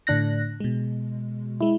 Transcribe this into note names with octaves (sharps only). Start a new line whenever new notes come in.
A2 D3 D4 F#6 A#6
B2 G#3
G#3 E4